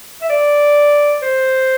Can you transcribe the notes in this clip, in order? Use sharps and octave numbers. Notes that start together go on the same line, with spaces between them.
E5
D5
C5